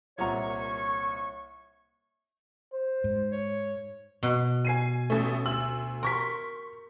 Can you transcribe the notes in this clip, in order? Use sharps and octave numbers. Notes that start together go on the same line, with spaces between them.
C2 A#2 F4 C#5 F#5 A#5 C#6
C5
G#2
C#5
B2
G#5 C7 D#7
A1 A3
D2 E6 F#7
A#4 C6 C#6 B6